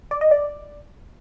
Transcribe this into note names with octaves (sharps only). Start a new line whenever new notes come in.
D5
D#5
D5